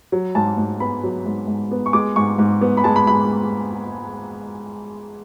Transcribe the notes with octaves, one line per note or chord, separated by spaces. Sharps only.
F#3
G#2 A5
G#2
B3 B5
F#3
G#2
G#2
B3
C#6
G#3 D6
G#2 C#6
G#2
B3
B5
G#3 A5
B5
B5